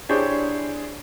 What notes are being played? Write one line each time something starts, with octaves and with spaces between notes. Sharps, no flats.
D4 E4 G4 G#4 C5 C#5